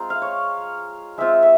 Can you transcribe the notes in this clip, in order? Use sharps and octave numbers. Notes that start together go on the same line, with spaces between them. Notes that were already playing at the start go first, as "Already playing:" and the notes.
Already playing: G#3 C4 F4 A#5 C6
F5
C#5
G#3 C4 F4 E5
E5